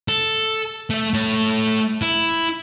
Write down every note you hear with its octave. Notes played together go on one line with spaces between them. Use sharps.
A4
A3 E5
A3 C#5
E4